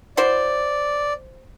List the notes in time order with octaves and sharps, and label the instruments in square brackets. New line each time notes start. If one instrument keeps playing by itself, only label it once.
[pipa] E4 F#4 C5 [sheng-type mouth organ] D5